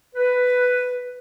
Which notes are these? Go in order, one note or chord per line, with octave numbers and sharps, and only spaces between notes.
B4